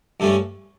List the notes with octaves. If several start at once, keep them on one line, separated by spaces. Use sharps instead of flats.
G2 D3 A3 C#4